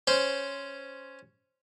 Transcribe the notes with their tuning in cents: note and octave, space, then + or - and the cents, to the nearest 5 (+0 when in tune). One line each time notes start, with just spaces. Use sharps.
C#4 +0 C5 +0